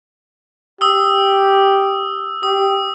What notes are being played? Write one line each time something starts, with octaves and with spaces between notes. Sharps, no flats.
G4 D#6 E6
G4 D#6